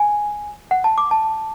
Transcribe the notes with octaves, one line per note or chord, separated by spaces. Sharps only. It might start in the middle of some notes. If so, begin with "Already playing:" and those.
Already playing: G#5
F#5
A5
D6
A5